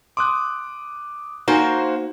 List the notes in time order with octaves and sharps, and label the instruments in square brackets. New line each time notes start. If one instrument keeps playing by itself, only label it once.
[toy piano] C6 [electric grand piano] D6 D#6 F#6
[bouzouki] A#3 C5 F5 [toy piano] D#4 G#5 [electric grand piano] F#4